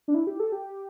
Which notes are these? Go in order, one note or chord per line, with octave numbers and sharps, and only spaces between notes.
D4
E4
G4
A4
G4